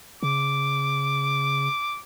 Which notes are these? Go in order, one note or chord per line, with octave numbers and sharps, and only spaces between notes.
C#3 D6